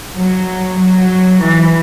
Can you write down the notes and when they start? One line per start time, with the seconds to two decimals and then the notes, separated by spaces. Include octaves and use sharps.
0.15 F#3
0.79 F#3
1.42 E3